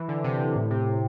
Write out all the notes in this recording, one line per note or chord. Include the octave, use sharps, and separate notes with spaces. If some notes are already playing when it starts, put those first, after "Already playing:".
Already playing: E3
D3
C3
A2
C3